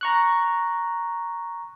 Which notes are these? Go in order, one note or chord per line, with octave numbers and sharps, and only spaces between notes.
A#5 C#6 F#6